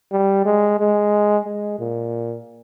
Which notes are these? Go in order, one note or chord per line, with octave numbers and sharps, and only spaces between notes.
G3
G#3
G#3
G#3
A#2